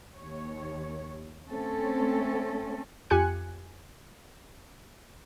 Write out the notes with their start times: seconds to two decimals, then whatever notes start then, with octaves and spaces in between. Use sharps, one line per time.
0.17 D#2 C#5
1.51 A3 C4 C#4 A4
3.10 F2 F4 G4 G#5 F#6 C#7